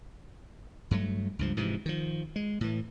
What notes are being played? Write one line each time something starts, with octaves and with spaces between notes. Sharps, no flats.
G2 F#3 A3
C#2 G2 F3
G#2 C3 E3 F3
D#3 F3
G#3
A2 E3